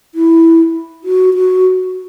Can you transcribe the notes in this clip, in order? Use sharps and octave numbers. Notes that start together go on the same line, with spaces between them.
E4
F#4
F#4